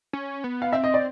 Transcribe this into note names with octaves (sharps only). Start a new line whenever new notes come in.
C#4
B3
F5
C4 E5
D#5
D5